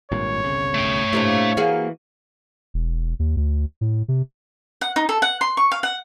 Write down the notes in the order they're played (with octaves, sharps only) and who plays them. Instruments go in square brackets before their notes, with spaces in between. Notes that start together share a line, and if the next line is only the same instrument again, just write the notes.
[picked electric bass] G#1 G2 A#2 [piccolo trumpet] C#5
[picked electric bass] G1 C2 C#3
[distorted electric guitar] A3 G5
[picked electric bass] A2 [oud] C3 A#3 D4
[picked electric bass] E3 [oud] A#3 F#4 G#4
[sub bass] E1
D#2
D2
A2
C3
[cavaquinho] F#5
D#4
A4
F#5
C6
C#6
F5
F#5